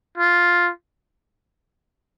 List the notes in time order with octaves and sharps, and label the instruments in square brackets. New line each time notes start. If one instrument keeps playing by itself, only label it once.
[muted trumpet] F4